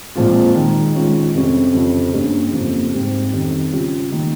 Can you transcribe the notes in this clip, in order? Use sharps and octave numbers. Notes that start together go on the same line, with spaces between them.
A#2 F3 G#3 C4 F4
D#3 G#3 D#4
D#3 G#3 C#4 F4
F2 C3 G3 C#4
F2 C#3 F3 C4 F4
G2 G3 A#3 C#4
F2 C#3 F3 A#3
G#2 G3 C4
F2 D#3 G3 C#4
C#3 G3 C#4 F4
D#3 A#3